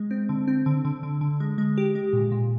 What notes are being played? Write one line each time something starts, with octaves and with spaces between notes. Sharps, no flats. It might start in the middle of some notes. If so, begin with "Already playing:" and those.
Already playing: G#3
C4
D3
C4
D3
D3
D3
D3
G#3
G#3
G4
G#3
A#2
A#2